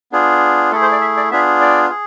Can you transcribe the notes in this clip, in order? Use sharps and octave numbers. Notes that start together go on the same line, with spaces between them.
B3 D4 F4 G#4
A3 E4 G#4 A4
C5
D5
E5
D5
B3 D4 F4 G#4 E5
D5
G#4